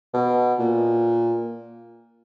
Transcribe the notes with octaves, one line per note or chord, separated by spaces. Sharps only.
B2
A#2